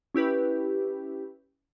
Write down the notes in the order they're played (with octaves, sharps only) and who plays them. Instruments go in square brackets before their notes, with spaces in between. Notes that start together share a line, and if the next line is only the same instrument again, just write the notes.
[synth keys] C#4 E4 G4 B4